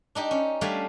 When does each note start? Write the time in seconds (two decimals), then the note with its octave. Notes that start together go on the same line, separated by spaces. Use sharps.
0.15 D4 D#4 G4
0.31 C#4
0.61 G3 A3 D4 F5 G#5